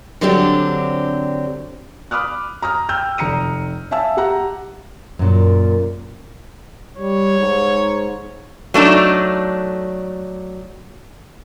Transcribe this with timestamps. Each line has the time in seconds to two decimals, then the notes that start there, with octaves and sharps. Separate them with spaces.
0.21 D3 F#3 C4 D4 G4
2.11 B5 D6 D#6 F6 F#6
2.62 A#5 D#6 F6
2.89 G5 E6 F6 G6
3.18 F1 A#5 C#7 D#7
3.91 E5 F5 G#5 A5 E6
4.17 G4 F#5 A#5
5.19 F#2 A#2
6.97 G3 C#5
7.40 G#2
8.74 F#3 A3 D4 D#4